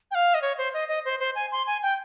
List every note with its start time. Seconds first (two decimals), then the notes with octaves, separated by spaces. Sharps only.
0.11 G5
0.15 F5
0.34 D#5
0.42 C#5
0.58 C5
0.74 D#5
0.89 D#5
1.05 C5
1.20 C5
1.35 G#5
1.52 C6
1.67 G#5
1.83 G5